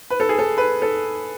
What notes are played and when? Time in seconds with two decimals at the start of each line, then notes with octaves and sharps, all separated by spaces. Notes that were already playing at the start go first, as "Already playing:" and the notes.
0.10 B4
0.20 A4
0.29 G#4
0.39 A4
0.58 B4
0.82 A4